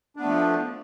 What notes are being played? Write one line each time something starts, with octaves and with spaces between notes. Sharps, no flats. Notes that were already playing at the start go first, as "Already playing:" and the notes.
F3 A3 B3 D4